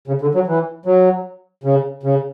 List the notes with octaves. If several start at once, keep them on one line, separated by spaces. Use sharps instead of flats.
C#3
D3
F#3
E3
F#3
C#3
C#3